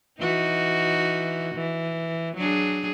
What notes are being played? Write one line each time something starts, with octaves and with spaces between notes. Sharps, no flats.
E3 D#4 F#4
E3
F#3 D4 G#4